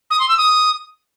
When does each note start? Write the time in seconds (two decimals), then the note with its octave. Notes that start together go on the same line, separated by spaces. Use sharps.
0.10 D#6
0.20 C6
0.29 E6
0.38 D#6